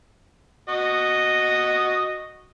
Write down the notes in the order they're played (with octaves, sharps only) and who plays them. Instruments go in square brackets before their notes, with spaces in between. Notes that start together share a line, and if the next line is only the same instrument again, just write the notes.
[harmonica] F#4 D#5